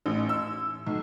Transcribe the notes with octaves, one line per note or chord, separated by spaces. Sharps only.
A1
E6
B1